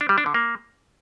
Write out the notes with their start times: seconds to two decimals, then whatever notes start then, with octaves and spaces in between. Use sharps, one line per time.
0.01 D4
0.09 G3
0.18 D4
0.26 D3
0.34 A#3